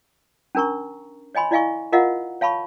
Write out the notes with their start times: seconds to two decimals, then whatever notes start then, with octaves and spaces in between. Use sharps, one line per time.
0.55 C#4 D4 A#4 A#5 C#6
1.35 C#5 D#5 G#5 B5 C6
1.51 E4 D5 D#5 F5 G#5 C#6
1.92 F4 A#4 D#5 F5 F#5 A#5
2.41 C#5 F5 A5 B5 C#6